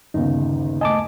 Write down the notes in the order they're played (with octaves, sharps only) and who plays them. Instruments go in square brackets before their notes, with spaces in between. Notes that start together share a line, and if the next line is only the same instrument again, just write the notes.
[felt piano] G1 D#2 C#3 [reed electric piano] D#4
[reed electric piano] A3 D#5 [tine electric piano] G#5 A5 D6